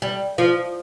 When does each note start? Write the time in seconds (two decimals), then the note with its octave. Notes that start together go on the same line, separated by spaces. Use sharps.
0.02 G3
0.38 F3